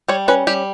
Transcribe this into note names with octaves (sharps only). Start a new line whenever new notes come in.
G3 C#5
C#4 B4
G3 G4